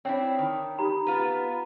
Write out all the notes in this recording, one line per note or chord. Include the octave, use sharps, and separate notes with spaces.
C4 D4 E4 C#5 G5
D#3
D#4 G4 A#5 B5
B3 F4 B4